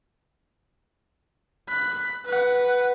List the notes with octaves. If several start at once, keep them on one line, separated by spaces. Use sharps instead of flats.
B5 F#6
B4 F#5